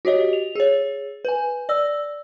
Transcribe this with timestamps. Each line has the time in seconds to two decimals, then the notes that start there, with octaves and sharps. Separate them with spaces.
0.05 F#4 G4 C#5 D#5
0.33 F7
0.55 G#4 C#5
1.25 B4 G#5
1.69 D5 E6